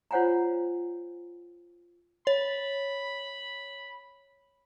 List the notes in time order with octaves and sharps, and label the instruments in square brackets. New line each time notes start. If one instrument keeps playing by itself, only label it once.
[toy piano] F4 C5 C#5 F#5 G#5 A#5
[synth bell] C#5 [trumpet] B5